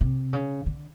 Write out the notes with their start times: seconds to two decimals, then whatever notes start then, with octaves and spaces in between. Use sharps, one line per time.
0.01 C3
0.33 C#3
0.66 D3